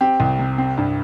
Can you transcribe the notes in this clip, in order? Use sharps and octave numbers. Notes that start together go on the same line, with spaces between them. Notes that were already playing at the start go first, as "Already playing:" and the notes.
C4 G4
C2
C3
C4
G2